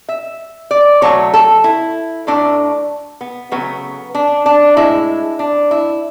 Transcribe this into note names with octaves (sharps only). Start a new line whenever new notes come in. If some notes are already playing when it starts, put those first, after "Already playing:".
E5
D5
B2 F#3 A3 C#5
A4
E4
A2 F#3 A3 D4
B3
C#3 F#3 A3 B3
D4
D4
A2 G#3 E4
D4
E4